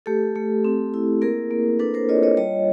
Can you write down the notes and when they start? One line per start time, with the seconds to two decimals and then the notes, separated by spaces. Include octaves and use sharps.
0.06 A3 G4 A4
0.35 A3
0.65 C4
0.94 E4
1.21 A#3 G#4 A#4
1.51 A#3
1.79 D4 A4 B4
1.94 A#4 C5
2.09 F4 C#5 D#5
2.23 C#5 D#5
2.37 G3 C#5 D#5